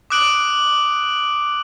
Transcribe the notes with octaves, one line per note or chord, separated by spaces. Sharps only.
D6 D#6 F#6 D7 F#7